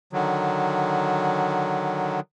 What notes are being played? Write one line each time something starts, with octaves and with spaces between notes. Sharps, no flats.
D3 D#3 F#3